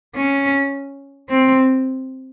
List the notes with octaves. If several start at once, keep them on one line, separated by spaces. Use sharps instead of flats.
C#4
C4